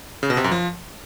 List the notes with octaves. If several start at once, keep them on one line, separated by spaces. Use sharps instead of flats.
C#3
B2
C3
F#2
F3